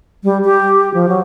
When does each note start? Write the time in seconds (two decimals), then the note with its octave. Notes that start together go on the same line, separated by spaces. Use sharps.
0.24 G3
0.44 G4
0.94 F3
1.09 F#3